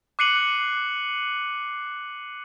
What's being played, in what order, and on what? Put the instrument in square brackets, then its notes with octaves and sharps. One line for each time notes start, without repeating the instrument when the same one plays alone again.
[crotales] D6 F#6 C7 C#7 D#7 F#7